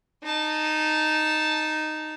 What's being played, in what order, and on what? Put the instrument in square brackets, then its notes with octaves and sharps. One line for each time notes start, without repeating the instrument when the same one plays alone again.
[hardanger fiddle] D#4 A5